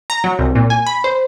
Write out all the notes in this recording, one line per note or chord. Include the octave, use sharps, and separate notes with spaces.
A#5
F#3
C2
A#2
G#5
B5
C5